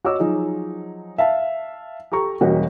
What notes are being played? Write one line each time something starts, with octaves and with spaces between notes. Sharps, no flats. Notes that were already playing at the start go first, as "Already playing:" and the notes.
F#4 C#5 D#5 D6 E6
F3 F#3 D#4 G#4
E5 F5 A5
G4 A4 A#5 C#6
E1 G3 A#3 C#4 F#4 D#5